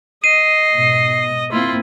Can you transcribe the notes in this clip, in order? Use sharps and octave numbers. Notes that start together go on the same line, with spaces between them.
D#5 C7 D#7
G#2 B2
A#3 C4 E4 F4 C6